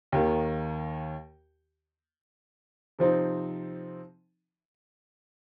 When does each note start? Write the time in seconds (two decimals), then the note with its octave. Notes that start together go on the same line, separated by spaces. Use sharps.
0.12 D#2 D#3 A#3
2.99 C3 F3 C4 D#4